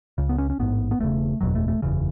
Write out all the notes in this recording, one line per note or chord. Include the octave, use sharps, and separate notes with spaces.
C#2 C#3
B3
C#4
C#4
A1 G#2 B3
B3
E1 E2 C#3 A3
F#1 E2 B2 F#3
A3
A3
F#1 E2 C#3